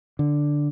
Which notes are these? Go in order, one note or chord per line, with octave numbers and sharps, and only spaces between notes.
D3